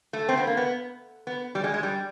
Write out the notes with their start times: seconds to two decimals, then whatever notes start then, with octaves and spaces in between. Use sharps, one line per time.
0.13 A3
0.29 C4
0.37 B3
0.47 A#3
0.57 B3
1.27 B3
1.55 G3
1.64 G#3
1.74 G#3
1.83 G3